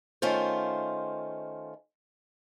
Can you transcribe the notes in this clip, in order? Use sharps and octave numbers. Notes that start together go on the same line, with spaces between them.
D#3 A3 C#4 F4 C5